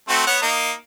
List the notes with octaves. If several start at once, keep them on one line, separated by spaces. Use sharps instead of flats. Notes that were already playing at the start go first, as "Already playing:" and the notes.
A3 C4 F#4
B3 C#5 F#5
A#3 D#4